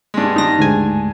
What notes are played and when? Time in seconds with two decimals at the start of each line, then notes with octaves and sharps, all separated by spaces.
0.14 G2 G#3
0.36 G2 D#3 D#4 A#6
0.59 D2 G#2 G#5